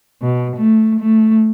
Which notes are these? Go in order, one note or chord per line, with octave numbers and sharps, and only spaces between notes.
B2
A3
A3